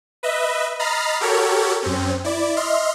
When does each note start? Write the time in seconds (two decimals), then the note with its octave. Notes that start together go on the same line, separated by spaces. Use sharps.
0.23 B4 D#5 E5
0.79 D#5 A#5 B5 F6 A6 C7
1.20 F#4 G4 A4 A#4 C#5
1.82 F#2 C4 C#4
2.24 E4 D5
2.56 D#5 E5 C6 F6